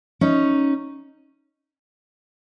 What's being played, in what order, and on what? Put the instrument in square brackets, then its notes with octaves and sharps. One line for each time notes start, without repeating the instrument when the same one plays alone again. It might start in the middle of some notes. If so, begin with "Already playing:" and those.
[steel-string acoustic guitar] C#4 D#4